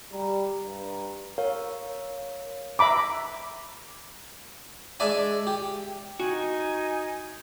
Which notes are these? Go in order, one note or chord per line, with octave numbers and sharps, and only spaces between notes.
G3 A#5
G2
A#4 C#5 F5
E5 A#5 B5 D6
G#3 D4 D5 E5 G#5
G4
D#4 F#4 G#5